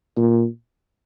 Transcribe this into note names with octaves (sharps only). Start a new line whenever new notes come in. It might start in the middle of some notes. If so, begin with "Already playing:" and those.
A#2